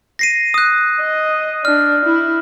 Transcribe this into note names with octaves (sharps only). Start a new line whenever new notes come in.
A#6 C7 D#7
D#6 F#6
D#5
D4 F6
E4